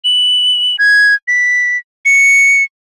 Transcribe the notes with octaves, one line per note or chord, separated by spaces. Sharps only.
F#7
G#6
B6
C#7